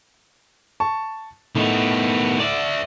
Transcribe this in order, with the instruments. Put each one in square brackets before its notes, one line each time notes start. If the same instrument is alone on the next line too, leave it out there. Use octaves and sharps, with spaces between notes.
[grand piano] A5 C#6
[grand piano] A2 [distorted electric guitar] D#3 B3
[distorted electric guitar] D5 E5